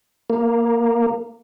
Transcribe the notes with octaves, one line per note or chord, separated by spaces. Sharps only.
A#3